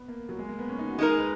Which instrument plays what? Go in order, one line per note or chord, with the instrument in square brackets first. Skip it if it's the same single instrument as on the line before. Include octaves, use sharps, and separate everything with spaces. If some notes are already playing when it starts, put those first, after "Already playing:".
Already playing: [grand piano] B3
A#3
F#3
G#3
A#3
B3
C#4
D#4
F#4
[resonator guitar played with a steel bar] G#3 D#4 A#4
[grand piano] G#4
B4